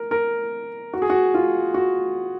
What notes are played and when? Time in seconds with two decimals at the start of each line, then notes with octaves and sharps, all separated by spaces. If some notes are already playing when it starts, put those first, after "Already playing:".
Already playing: A#4
0.11 A#4
0.93 F#4
1.02 G#4
1.10 F#4
1.34 F4
1.74 F#4